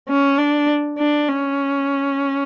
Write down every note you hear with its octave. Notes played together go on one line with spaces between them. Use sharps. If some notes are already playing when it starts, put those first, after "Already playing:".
C#4
D4
D4
C#4